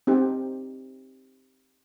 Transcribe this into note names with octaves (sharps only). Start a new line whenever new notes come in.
C4 D#4 G4